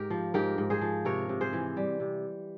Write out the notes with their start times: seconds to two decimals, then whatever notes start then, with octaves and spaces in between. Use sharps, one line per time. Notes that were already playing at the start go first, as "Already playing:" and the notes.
Already playing: G#2 G4 A#4
0.10 F3
0.34 G#2 G4 A#4
0.58 G#2
0.70 G#4 C5
0.81 F3
1.05 C3 A#4 C#5
1.29 C3
1.41 G#4 C5
1.53 E3
1.77 G3
2.00 C3